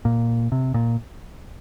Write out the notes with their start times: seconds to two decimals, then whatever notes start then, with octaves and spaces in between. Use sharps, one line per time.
0.05 A#2
0.52 C3
0.74 A#2